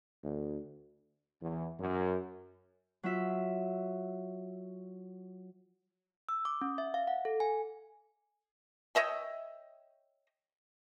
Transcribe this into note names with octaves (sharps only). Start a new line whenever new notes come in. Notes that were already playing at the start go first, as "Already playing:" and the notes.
D2
E2
F#2
F#3 F4 E5
E6
D6
C#4
E5
F5
F#5
A4
G#5
C#5 D#5 E5 G5